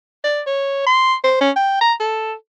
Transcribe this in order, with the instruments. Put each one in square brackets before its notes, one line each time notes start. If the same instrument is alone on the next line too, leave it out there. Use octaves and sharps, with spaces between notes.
[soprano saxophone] D5
C#5
C6
C5
C#4
G5
A#5
A4